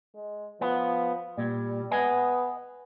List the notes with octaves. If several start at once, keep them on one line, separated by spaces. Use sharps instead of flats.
G#3
F3 B3
A#2 G3
B3 D#5 G#5